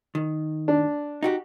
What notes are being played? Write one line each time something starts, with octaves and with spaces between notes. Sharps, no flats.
D#3
D4
D#4 F#4 G4